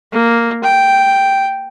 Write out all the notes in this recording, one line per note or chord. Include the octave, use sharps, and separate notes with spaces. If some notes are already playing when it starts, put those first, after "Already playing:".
A#3
G5